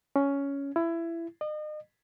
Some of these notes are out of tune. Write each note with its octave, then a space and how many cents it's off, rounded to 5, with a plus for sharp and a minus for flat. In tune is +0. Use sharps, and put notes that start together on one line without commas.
C#4 +10
E4 +20
D#5 -40